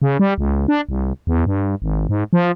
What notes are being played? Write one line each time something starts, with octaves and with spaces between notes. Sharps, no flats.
C#3
G3
C#2
D4
C2
E2
G2
G#1
G#2
F3